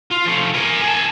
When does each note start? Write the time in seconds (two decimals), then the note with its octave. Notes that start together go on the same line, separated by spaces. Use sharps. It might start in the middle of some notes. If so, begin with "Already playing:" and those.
0.11 F4
0.25 F3 A3
0.54 A#4 G#5
0.83 G#4 A5